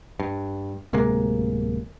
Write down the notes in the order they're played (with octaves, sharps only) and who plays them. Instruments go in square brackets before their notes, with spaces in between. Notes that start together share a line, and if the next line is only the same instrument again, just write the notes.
[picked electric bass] G2
D1 C3 G#3 A#3